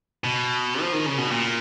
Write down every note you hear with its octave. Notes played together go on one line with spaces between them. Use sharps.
B2
F3
D#3
C#3
B2
A#2